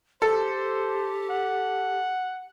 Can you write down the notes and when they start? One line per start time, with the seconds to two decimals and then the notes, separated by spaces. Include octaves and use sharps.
0.22 G4 A4 C5
1.31 F#5